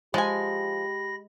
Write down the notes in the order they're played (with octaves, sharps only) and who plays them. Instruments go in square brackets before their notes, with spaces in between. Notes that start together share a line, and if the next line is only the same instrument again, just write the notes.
[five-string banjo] F3 G#5 [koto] G#3 [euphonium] G4 [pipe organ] B5 A#6